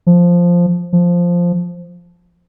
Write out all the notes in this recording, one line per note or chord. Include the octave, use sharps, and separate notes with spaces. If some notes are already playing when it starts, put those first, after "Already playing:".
F3
F3